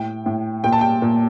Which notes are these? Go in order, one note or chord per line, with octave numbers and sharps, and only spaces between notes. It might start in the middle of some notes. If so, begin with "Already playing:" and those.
Already playing: A2 G5
A2
A#2 G5
A5
G5
A#2